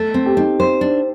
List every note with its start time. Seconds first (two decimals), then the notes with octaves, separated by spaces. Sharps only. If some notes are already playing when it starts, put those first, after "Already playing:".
Already playing: A3 A4
0.14 C4
0.26 G4
0.37 C4 D#4
0.60 C5
0.81 D4